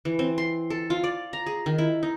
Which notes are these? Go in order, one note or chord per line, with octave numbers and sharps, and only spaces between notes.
E3
C4
C6
A4
F4
D5
A#5
G#4
D#3
E4
D#4